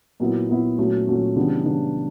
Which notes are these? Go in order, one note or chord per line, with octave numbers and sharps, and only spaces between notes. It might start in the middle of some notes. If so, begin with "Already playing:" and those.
A#2 F#3 B3 E4
A#2 F#3 B3 E4
A#2 F#3 A3 C#4 F#4
A#2 F#3 A3 C#4 F#4
C#3 E3 G3 B3 D4
C#3 E3 G3 B3 D4